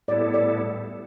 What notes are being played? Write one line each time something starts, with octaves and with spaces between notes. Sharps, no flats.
A2 G3 B3 E4 A4 D5
D5